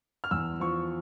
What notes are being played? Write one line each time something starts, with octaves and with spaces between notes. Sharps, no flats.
F6
E2 E6
F3 C#6